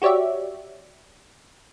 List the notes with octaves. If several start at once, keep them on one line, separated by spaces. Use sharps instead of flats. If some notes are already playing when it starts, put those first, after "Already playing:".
F#4 G4 C#5 D5 E5